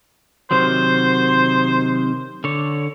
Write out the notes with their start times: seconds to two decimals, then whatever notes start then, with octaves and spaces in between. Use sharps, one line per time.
0.51 C3 D#3 F#3 C5
2.44 D3 C#5